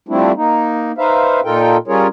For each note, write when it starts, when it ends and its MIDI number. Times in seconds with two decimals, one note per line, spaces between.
0.09 0.32 53
0.09 0.32 55
0.09 0.32 57
0.09 0.32 60
0.09 0.32 62
0.09 0.32 64
0.36 0.92 58
0.36 0.92 63
0.98 1.40 63
0.98 1.40 71
0.98 1.40 72
0.98 1.40 76
0.98 1.40 77
1.45 1.77 46
1.45 1.77 63
1.45 1.77 65
1.45 1.77 69
1.45 1.77 70
1.45 1.77 79
1.88 2.07 55
1.88 2.07 61
1.88 2.07 65
1.88 2.07 68
1.88 2.07 70
1.88 2.07 73